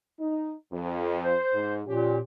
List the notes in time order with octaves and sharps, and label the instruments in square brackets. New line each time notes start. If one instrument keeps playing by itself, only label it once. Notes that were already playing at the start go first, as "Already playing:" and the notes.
[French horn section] D#4
F2
[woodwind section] C5
[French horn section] G#2
[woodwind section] A#2 [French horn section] F3 C#4 G4